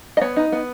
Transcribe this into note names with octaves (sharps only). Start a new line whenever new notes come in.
D#5
B3 C#5
D#4
B3